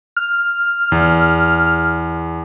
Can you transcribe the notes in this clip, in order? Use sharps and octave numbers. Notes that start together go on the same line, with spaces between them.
F6
E2